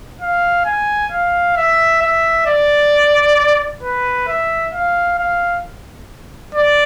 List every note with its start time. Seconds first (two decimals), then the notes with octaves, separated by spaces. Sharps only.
0.21 F5
0.66 G#5
1.12 F5
1.57 E5
2.02 E5
2.47 D5
3.83 B4
4.28 E5
4.74 F5
5.19 F5
6.55 D5